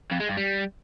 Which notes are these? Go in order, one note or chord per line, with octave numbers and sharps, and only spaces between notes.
F2
G#3
G2
G3